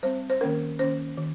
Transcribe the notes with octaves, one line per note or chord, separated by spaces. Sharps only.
G3 C4 C5
C5
D#3 A#3 C#4 A#4
D#3 A#3 C#4 C5
D#3